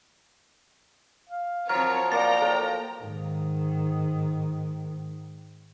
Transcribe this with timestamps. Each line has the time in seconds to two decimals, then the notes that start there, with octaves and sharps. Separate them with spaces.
1.30 F5
1.69 F3 F#3 C4 A#4 C#5 A#5 F6
2.12 A#3 A#4 D5 G5 A#5 A6
2.42 A4
3.01 G#2 D#3